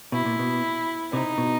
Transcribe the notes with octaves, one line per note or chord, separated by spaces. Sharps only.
B2 E4
A#2
B2
C3 D#4
B2